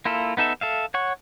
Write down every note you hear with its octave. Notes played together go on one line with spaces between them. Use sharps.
A#3 E4 F4 A4
B3 D#4 A4 E5
A4 E5 F5
C#5 F#5 C#6